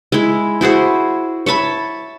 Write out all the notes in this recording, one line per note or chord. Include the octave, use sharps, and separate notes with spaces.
G#3 E4
E4 F#4 G#4 C5
C#5 E5 A5 B5